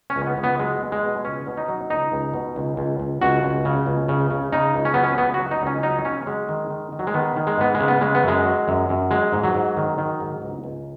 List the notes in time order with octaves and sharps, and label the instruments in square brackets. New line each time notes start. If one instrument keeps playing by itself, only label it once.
[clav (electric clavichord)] C#4
C#2
B3
C#2
B3
F#3 G#3
B2
G#3
B2
C#2 C#4
B2
D#4
F#3
C#2 D#4
C#2
B2
C#2
C#2
C#2
C#2 F#4
C#2
C#3
C#2
C#3
C#3
C#3 D#4
C#2
C#4
F#3 B3
C#4
C#2 B3
F#4
F#3
D#4
C#2
C#4
F#3 D#4
C#3 C#4
F#3 G#3
D#3
D#3
D#3
F#3
G#3
D#3 B3
D#3
G#3
G#2 B3
G#3
C#3
B3
C#3 G#3
B3
F#2 G#3
F#3
F#2
F#2
F#3 G#3
G#2
F#3
G#2
D#3
D#3
G#2
C#2
C#2